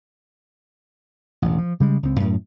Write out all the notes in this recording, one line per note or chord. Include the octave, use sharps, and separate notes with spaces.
E1 A1
F3
C#3 G3 G#3
C#2 C4
F#2 A2